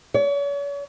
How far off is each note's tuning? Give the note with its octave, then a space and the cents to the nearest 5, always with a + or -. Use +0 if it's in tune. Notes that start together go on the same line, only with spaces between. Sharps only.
C#5 +40